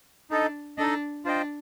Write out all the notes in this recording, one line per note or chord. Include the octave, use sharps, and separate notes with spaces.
D4 D#4 A4 D#5
D4 D#4 A4 D#5
D4 F4 C5 D#5 G5